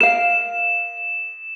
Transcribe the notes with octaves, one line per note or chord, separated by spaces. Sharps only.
A#4 F5 E7